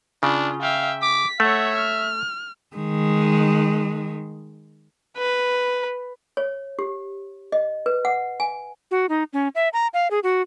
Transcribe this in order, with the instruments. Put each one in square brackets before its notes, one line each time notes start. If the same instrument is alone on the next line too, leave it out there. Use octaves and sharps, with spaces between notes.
[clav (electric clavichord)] C#3 [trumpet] D4 [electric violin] F4
[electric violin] E5 G5 [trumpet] F5
[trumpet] D6 [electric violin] B6
[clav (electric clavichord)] A3 [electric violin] C#5 F#5 [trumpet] E5
[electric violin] F6
[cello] D#3 G#3
[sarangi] B4
[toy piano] C#5
G4
D#5
B4
F#5
G#5
[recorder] F#4
D#4
C#4
E5
A#5
F5
G#4
F#4